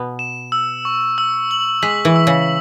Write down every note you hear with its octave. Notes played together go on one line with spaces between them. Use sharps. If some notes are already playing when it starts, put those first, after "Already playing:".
Already playing: B2 B3
E7
E6
C#6
E6
F#7
G#3 B6
E3
E6
C#3